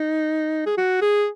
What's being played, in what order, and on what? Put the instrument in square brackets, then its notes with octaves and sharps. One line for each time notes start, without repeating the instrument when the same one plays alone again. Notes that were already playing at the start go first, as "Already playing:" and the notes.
Already playing: [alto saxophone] D#4
G#4
F#4
G#4